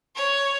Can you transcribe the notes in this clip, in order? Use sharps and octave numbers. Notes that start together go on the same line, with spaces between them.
C#5